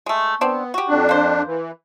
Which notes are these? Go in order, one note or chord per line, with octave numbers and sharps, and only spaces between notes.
G#3 A3
B3 C4 D4
F#4 G4
F2 D4
A#3 C5
E3